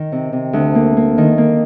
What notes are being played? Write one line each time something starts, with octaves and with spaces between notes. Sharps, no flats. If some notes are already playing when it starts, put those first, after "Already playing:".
Already playing: D#3
C3
C3
D2
A#3
A#3
D#3
A#3